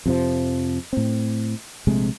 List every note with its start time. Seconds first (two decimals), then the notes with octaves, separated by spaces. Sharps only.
0.06 F2 C3 F3
0.93 A2 C4
1.87 A#1 C3 G#3 A3